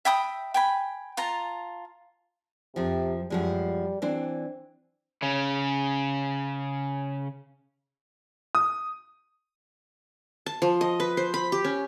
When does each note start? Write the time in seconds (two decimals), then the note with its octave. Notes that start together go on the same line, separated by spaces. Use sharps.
0.05 E5 G5 B5 D#6
0.54 G5 G#5 B5
1.17 F4 A5 A#5
2.76 F2 C3 F3
3.30 F#2 F3 G3 G#3
4.02 E3 C4 D4 C5
5.22 C#3 C#4
8.55 D#6
10.46 A5
10.62 F3
10.81 D#5
11.00 B4
11.17 C5
11.34 B5
11.52 G4
11.65 C#4